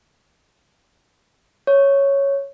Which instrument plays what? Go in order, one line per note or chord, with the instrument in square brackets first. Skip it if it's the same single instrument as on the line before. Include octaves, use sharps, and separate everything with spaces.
[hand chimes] C#5